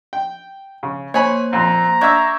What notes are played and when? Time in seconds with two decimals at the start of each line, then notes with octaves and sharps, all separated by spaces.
0.13 G5
0.83 C#3
1.14 A#3 C5 C#5 G#5 B5
1.53 F2 A#2 A#5
2.01 D4 E5 C#6 E6 G6 G#6